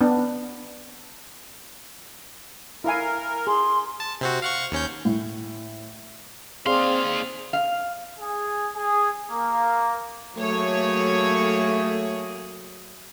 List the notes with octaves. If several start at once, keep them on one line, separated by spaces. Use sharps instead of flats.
B3 D4
E4 A#4 F5 G#5
G#4 C6
A5
C3 C4 F#4
F5 F#5 C#6
D#2 C#4 G6
A2
D#2 C4 G#4 D5 F5 C6
F5
G#4
G#4
A#3
F#3 A3 A#3 G#4 C#5